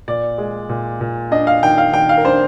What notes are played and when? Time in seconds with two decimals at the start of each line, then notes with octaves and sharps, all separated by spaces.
0.08 A#2 D5
0.38 G#3
0.69 A#2
1.01 A#2
1.31 D4 D#5
1.47 F5
1.62 D#3 G5
1.78 F5
1.93 D#3 G5
2.09 F5
2.17 A#4
2.25 D4 C5